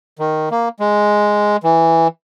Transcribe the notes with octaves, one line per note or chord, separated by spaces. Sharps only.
D#3
A#3
G#3
E3